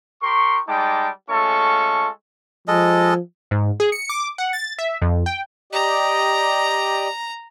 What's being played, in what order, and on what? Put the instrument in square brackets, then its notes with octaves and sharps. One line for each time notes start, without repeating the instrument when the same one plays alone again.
[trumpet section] G4 A#4 C6 C#6
G3 G#3 D#4 G5 A5 D6
G#3 A3 C#4 F4 A4 C#6
[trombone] F3 [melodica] G#3 A4 D#5
[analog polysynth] G#2
G#4
C#7
D6
F#5
A6
E5
F2
G5
[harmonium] G4 D5 D#5 [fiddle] A#5